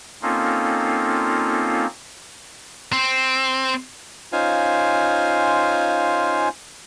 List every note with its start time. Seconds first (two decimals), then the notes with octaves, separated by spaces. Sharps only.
0.22 A#3 C4 C#4 D#4 F4 A4
2.92 C4
4.33 C#4 D#4 F4 C5 F5 G#5